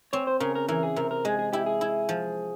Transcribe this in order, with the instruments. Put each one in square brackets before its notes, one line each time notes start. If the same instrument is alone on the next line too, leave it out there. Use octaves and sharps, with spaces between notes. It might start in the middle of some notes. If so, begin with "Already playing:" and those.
[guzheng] C4 [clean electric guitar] C#5
[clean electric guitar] C5
[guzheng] C#3 [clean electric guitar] A#4
[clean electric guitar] A#4
[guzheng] E3 [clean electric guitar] A#4
[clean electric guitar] G#4
[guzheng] C3 [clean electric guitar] A#4
[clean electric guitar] A#4
[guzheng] G#3 [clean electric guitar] G#4
[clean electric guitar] G#4
[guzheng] E4 [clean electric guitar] G4
[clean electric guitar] G#4
[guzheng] E4
F3